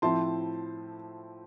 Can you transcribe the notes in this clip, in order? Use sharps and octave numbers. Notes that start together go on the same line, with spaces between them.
A2 F3 C4 E4 A5 C6